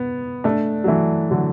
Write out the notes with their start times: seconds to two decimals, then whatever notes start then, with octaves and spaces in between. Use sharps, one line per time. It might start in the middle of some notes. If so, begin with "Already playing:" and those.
Already playing: B3
0.44 A3 D4
0.84 F#3
0.88 E3 A3
1.31 D3 F#3